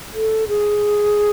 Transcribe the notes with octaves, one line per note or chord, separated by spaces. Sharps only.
A4
G#4